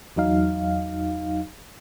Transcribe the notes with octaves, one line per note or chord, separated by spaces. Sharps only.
E2 F#3 D#4 F5